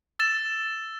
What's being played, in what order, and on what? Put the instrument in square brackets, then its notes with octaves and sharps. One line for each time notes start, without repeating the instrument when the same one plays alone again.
[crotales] E6 A6 E7